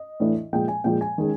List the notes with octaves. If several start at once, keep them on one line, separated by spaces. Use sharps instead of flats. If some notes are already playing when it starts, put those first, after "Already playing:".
Already playing: D#5
A2 E3 A3 D4
A#2 F3 G#3 G5
G#5
A#2 F3 G#3 G5
G#5
D#3 G#3 C#4